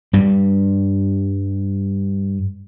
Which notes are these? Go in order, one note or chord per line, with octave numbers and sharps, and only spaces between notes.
G2 G3